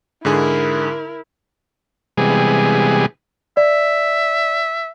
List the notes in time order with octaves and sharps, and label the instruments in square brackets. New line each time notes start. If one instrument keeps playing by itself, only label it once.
[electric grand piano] G#2 D3 G#4 [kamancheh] E4 A#4
[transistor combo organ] C3 E3 G3 G#3 B3 G#4
[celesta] D5 [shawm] E5